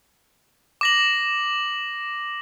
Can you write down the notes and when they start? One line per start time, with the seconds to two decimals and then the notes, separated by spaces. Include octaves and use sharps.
0.81 D6 A#6 F#7